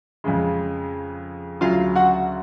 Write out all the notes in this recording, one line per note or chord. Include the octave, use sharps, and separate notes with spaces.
F2 C#3 G#3
D2 C#3 F#3 F4 F5
F#4 F#5